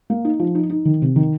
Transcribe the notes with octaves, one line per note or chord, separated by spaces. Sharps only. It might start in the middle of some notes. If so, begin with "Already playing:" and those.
A#3
D#4
F3
D#4
D#4
D#3
C3
D#3